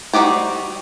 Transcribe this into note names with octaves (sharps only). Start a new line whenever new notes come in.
G3 D#4 F#4 G4 C5